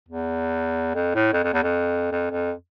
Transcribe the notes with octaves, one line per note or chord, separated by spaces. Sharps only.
E2
F2
A2
F2
F2
E2
F2
F2
F2